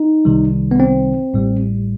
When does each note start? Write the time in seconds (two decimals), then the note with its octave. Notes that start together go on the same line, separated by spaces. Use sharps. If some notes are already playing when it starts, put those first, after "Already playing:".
Already playing: D#4
0.25 C2 C3 D#3 G3
0.71 B3
0.80 C4
1.33 A1 A2 G3